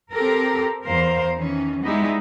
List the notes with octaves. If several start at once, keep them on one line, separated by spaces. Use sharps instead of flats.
C4 G4 A4 A#4
E2 A#4 C5 F5
D#3 E3 C#4
G3 G#3 B3 D#4 E4 G4